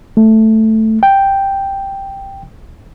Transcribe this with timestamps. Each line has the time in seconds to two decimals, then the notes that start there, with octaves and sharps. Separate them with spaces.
0.17 A3
1.03 G5